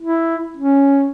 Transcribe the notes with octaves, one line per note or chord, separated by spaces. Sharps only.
E4
C#4